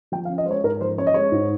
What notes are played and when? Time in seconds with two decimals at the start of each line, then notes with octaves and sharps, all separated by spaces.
0.12 F3 G5
0.25 F5
0.30 C#4
0.38 D#5
0.46 G#3 C5 C#5
0.63 G#2 A#4
0.81 F3 C5
0.98 C#4 C#5
1.07 D#5
1.14 G#3 C#5
1.32 G#2